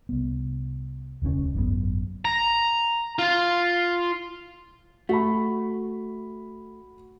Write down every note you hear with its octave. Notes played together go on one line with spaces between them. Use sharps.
C2 B3
E1 C#2 D#3 C#4
G#1 F#2 D3 B3
A#5
F4
A3 F#4 B5